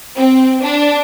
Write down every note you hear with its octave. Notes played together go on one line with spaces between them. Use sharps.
C4
D4